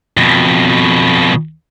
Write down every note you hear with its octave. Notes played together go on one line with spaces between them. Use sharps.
F2 B2